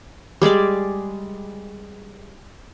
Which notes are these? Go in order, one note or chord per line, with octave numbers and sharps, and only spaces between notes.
G3 G#3 G#4 D5